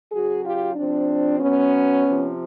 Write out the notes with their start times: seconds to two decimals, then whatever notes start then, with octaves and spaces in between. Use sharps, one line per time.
0.12 C#3 F#3 F#4 G#4
0.44 F4 G4
0.76 C3 F3 C4 D4
1.40 B2 F#3 B3 C#4
2.05 C3 F3